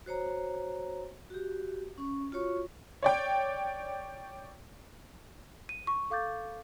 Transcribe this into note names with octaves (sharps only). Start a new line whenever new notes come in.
F#4 C5 C#5 A#5
F#4 G4
C#4 C#6
F4 F#4 C#5 C#6
C#5 D5 G5
D#7
C#6
A4 F5 D6 G6 A6